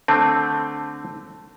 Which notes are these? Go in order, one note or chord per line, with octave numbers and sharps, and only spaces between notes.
D3 A3 C4 A5